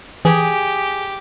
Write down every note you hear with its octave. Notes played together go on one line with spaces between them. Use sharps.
E3 G4 G#4